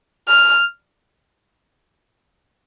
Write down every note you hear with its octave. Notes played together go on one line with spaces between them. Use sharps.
F6